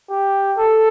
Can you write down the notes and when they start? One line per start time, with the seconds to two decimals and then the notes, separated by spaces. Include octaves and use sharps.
0.10 G4
0.57 A4